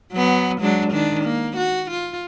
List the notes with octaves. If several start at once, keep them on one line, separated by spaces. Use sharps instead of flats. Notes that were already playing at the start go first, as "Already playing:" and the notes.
F#3 B3
F#3 G#3 D4
D#3 D4
A#3
F#4
F4